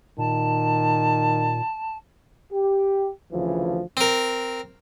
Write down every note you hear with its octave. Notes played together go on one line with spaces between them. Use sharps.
A#2 D#3 A5
G4
D2 C#3 E3 F3
C4 A#4